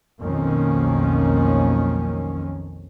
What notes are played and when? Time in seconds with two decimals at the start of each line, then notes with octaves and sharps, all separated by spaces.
0.21 B1 F2 D#3 A#3 C#4